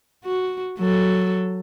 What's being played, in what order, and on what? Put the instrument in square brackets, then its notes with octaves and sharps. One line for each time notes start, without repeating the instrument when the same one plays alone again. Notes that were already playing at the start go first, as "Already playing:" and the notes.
[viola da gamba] F#4
F#3 A4